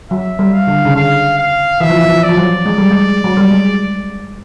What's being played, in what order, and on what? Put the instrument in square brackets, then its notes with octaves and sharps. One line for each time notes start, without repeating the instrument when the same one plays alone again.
[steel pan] F#3 [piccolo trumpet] E5
[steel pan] G3
[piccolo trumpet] F5
[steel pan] D3
C#3
[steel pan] D3 [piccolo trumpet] F5
[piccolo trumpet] F5
[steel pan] E3 [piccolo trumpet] E5
[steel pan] F3
E3
F3
[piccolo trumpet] D5
[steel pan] F3
F#3
G#3
G3
G#3
F#3
G3
G#3